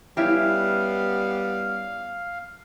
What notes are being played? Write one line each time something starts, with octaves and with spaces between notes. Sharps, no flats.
G3 B3 C#4 E4 G4 F5